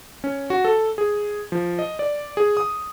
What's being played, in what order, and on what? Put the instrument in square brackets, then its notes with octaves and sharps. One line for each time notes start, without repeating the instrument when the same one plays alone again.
[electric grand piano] C#4
F#4
A4
G#4
F3
D#5
D5
G#4
D#6